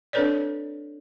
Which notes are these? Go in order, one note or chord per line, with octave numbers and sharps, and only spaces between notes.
C4 D4 A4 B4 C#5 D5